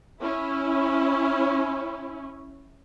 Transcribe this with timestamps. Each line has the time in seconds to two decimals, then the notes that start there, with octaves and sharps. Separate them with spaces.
0.21 C#4 E4